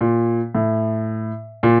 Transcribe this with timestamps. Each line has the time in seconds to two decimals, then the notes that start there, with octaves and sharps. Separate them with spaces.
0.01 A#2
0.55 A2
1.63 A#2